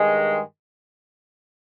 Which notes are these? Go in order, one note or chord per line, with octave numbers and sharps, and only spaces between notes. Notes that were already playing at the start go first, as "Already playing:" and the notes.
Already playing: G2 D#3 G#3